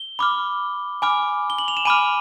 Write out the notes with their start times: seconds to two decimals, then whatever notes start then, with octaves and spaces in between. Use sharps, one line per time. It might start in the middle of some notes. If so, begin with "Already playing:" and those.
Already playing: G7
0.19 B5 D6 F6
1.02 G#5 B5 D6 F6
1.50 G7
1.58 F#7
1.68 F7
1.77 E7
1.85 G#5 B5 D6 F6 D#7